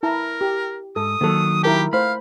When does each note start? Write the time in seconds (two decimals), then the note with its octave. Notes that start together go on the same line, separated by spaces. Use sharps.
0.03 E4 A#4 A5 A#5
0.41 G4
0.96 G#2 A4 D#6
1.21 D#3 F#3 A#3 A4
1.63 E4 G4 A#4 A5
1.93 A3 C5 F5 B5